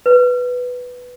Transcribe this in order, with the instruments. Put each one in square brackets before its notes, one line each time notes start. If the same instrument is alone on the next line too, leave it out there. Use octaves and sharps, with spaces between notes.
[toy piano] B4